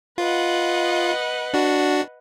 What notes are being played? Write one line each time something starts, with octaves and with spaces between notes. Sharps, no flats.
F4 B4 D#5 F#5
D4 F#4